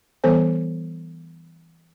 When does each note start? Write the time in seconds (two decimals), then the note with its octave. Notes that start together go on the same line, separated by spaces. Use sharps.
0.24 E3 G3 B3 A4 C5 G#5